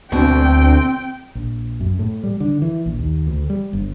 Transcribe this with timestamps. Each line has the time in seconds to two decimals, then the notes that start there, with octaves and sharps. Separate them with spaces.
0.12 D2 B2 C4 G5
1.35 A#1
1.80 F#2
1.99 A2
2.23 G3
2.40 D3
2.62 E3
2.86 A#1
2.99 D#2
3.26 D2
3.50 G3
3.73 G1